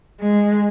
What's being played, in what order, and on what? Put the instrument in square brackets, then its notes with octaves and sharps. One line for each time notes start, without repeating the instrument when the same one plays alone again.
[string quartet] G#3